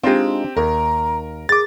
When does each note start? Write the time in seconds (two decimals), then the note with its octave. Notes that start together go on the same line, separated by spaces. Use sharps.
0.03 G#3 C4 D4 D#4 F4 G4
0.57 D#2 A#4 A#5
1.49 G#4 D6 A6